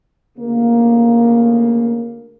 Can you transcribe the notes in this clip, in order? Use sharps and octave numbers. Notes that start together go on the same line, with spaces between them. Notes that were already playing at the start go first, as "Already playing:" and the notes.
D2 C#3 A3 A#3